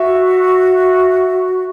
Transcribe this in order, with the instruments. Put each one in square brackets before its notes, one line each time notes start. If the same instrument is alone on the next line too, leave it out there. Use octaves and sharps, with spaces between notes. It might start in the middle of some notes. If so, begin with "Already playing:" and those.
Already playing: [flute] F#4 [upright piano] E5